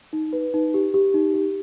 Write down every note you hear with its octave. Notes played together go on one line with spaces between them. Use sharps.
D#4
B4
D#4
G4
G4
D#4
G4